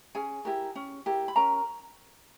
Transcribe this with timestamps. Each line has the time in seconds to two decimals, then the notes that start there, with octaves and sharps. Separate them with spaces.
0.15 C#4 G#4 G#5
0.45 E4 G4 A#4
0.76 C#4
1.06 E4 G4 A#4
1.28 B5
1.36 C#4 A#4 A#5